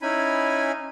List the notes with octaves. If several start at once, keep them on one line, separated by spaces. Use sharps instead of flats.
C#4 D#4 E4 G#5 B5